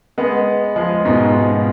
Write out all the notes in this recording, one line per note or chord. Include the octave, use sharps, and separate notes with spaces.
G#3 B3
F3 G#3
G#2 B2
G#2
B2